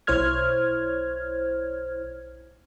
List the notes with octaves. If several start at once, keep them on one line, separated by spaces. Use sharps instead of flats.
B1 E4 C5 C#5 F6 G#6